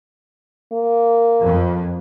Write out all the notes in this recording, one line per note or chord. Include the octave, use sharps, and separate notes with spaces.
A#3
F2